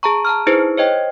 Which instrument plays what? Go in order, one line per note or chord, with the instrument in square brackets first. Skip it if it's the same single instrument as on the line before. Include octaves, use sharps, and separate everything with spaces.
[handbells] G#4 A5 A#5 C#6
A5 A#5 F6
D#4 E4 G#4 B4 C5
C5 C#5 D#5 G5